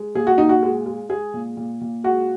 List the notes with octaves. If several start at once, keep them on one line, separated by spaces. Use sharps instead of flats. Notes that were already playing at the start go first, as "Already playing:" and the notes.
Already playing: G#3
A#2 G#4
F#4
A#2 D#4
F#4
G#3
G#3
G#3 G#4
A#2
A#2
A#2
G#3 F#4